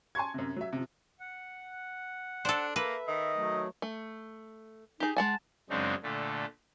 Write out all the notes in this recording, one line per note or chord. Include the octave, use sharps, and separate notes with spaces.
G#5 A5 C6 C#6 G#6
F#2 C3
F#3 E5
C3 F3
F#5
D4 A4 C5
A#3 B4 E5
D#3 D#5
F#3 A3
A3
D#4 G4 G#4
G#3 F#5 G#5 A5
F#2 C#3 G#3 C4 D4 D#4
A#2 D3 A3